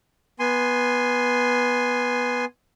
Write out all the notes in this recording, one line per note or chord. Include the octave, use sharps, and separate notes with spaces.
B3 G#5 C6